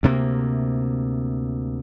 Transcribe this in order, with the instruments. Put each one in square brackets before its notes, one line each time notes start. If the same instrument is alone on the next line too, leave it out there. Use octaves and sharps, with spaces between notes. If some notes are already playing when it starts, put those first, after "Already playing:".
[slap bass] D2 C3 A#3